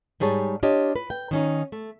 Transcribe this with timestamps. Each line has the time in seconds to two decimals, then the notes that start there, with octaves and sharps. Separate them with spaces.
0.20 G#2 G3 G#4 C#5 A5
0.63 D4 F4 G4 C#5 D#5
0.96 B4
1.10 G5
1.31 D#3 C#4 D#4
1.72 A3